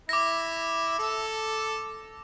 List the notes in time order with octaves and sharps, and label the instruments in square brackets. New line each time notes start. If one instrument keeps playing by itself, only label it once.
[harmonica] E4 [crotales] D6 A#6
[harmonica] A4